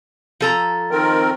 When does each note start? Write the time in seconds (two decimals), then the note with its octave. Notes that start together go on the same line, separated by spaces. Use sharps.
0.40 F3 A4 A#5
0.91 D#3 C4 A#4